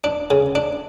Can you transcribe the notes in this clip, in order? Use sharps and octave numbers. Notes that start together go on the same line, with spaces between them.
D4
C#3
D4